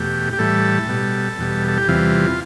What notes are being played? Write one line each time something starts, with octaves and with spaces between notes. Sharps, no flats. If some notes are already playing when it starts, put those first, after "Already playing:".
Already playing: E2 B2 A3 G4
G4
A2 E3 G3 A4
B2 G3
E2 B2 G3
A4
G4
E2 C3 E3 G3 F4